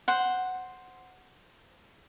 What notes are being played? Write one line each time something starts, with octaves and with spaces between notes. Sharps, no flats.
C5 F#5